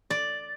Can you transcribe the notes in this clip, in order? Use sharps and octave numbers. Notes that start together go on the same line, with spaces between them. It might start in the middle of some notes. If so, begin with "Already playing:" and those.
D5